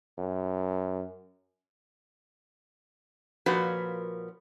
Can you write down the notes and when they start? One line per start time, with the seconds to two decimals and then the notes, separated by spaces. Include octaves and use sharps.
0.18 F#2
3.46 A#2 F3 C#4 F#4 A#4 B4